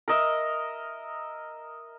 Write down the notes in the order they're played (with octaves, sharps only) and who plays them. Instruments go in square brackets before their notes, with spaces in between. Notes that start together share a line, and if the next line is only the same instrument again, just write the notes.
[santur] A#4 D#5 E5